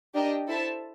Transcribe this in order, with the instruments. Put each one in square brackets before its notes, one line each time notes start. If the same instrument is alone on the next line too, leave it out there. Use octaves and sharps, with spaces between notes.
[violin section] D4 G4 A#4 D#5 G5
E4 A4 C5 E5 A5